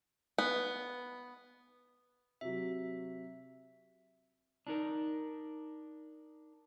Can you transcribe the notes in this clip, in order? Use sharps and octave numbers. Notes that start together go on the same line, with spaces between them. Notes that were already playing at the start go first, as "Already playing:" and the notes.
B3
C3 F#3 E5
D4 D#4 A#4